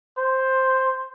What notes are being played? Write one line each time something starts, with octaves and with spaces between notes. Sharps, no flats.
C5